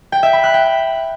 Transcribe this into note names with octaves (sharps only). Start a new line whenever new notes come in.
G5
E5
B5
F#6
G5